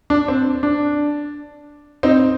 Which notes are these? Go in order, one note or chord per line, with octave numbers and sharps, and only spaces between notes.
D4
C4
D4
C4 D#4